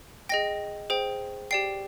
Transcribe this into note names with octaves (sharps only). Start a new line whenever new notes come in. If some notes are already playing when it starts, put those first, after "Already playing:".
G#4 D#5 G5 A#6
G#4 C5 G5
G4 D5 G5 C7